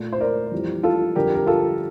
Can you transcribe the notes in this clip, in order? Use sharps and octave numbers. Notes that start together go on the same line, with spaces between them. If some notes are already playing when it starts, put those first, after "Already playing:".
Already playing: A#2 A3
C5
A#4 D5
F2 E3 G3
F4 A4
F2 D3 G3 G4 A#4
A#4
F4 A4